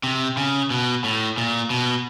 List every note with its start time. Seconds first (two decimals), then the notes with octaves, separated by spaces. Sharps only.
0.03 C3
0.37 C#3
0.70 B2
1.04 A2
1.37 A#2
1.70 B2